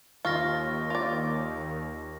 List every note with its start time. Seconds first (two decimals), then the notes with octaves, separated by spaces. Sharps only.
0.25 D#2 F4 C#6 F6 A#6
0.90 F4 D5